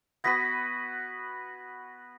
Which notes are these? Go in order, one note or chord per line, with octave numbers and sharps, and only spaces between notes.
B3 F#4 B4 G#6 A#6 B6